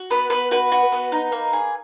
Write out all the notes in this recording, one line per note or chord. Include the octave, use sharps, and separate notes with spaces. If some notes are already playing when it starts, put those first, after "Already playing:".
Already playing: F#4
B3 B4
B3 B4
F#4 B4
F#4
B3
D#4
A#3
G#4